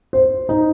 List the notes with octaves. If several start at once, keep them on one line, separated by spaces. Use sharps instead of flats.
C5
D#4